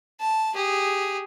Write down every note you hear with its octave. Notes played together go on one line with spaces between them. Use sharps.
A5
G4 G#4